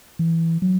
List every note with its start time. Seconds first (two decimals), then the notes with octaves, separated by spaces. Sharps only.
0.19 E3
0.62 F#3